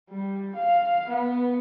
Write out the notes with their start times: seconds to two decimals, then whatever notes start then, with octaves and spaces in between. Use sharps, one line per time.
0.10 G3
0.55 F5
1.08 B3